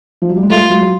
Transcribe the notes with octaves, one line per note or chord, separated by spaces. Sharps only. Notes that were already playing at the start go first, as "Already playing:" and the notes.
F3
F#3
G3
G#3
G3 A3 F4
F#3 G#3
F#3